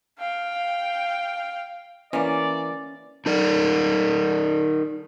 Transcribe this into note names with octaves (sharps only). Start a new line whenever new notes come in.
F5 G5
E3 A#3 C#4 D5
D#4 A#4 D5